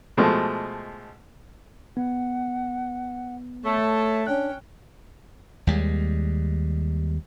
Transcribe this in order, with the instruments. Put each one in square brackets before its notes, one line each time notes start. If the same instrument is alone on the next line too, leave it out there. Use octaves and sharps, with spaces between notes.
[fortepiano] B2 F3 G#3 A3
[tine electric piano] B3 [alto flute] F#5
[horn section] A3 [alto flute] C#5 [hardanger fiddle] A5
[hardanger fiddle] C#4 G5 [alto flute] D4 [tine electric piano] F#6
[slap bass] D#2 G3 G#3